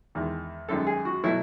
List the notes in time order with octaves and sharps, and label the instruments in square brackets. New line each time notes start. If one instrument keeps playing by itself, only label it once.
[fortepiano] E2 D#3 G#3
F#2 D#3 G#3 A4
G#4
F#4
B2 F#3 A3 E4